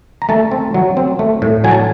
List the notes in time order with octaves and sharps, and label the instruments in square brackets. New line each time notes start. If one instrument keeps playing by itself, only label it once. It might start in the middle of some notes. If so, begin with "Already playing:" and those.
[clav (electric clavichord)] A#5
A3 A5
C4
F#3
C4
A3
A2
F#3 G#5
A5